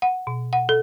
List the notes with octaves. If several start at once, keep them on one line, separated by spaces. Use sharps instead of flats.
F#5
B2
F#5
A4